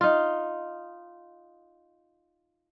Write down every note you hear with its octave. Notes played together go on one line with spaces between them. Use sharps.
D#4 F4